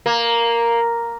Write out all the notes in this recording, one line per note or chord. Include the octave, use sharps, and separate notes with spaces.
A#3